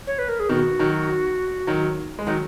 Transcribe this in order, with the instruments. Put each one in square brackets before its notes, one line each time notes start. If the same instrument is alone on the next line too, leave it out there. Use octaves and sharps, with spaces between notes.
[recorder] C#5
B4
A#4
G#4
[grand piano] B2 D#3 [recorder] F#4
[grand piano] D#3 F#3
D#3 F#3
G#3
[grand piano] D#3 F#3 [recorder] D#4